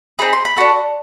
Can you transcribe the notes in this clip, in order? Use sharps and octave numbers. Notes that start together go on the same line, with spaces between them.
C4 D#4 G#4 B5
C6
B5
D4 F#4 A4